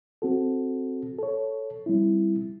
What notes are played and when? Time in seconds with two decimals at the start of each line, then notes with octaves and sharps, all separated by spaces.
0.22 C4 F#4 A4
1.19 A4 C#5
1.86 G3 C4 E4